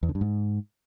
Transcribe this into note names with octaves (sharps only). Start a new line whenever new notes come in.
E2
D3
G2
G#2